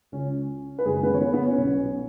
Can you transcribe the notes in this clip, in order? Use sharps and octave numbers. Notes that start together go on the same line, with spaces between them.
C#2 C#3 C#4
B4
F#1 F#2 D#3 G#3 G#4
B3 B4
C#5
B3 B4
B3 B4
C#4 C#5
B1 B2